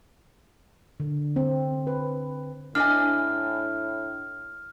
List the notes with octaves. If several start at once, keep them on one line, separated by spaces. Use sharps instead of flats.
D3
C4
B4
A2 D4 D#5 G#5 F6